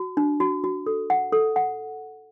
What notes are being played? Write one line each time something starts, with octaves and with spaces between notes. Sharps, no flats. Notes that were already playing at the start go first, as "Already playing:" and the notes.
Already playing: F#4
D4
F#4
F#4
A4
F#5
A4
F#5